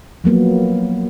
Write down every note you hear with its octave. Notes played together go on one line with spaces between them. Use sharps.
F3 F#3 A#3 B3